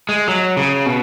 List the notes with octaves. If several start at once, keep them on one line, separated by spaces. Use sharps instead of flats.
G#3
F#3
C#3
B2